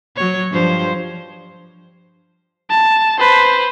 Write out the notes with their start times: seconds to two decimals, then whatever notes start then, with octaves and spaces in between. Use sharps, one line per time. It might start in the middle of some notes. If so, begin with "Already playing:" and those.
0.16 F#3 C#5
0.51 G2 F3 C5
2.70 A5
3.19 B4 C5